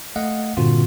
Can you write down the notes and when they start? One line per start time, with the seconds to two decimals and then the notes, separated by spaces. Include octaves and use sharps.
0.16 A3 D#5 F5 F#5
0.57 G2 A#2 D3 C4 F4 F#4